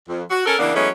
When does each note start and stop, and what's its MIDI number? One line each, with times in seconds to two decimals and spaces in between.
0.09 0.23 41
0.30 0.41 66
0.46 0.54 61
0.46 0.54 69
0.46 0.54 70
0.59 0.73 49
0.59 0.73 52
0.59 0.73 58
0.59 0.73 59
0.59 0.73 62
0.75 0.88 52
0.75 0.88 54
0.75 0.88 56
0.75 0.88 57
0.75 0.88 59
0.75 0.88 61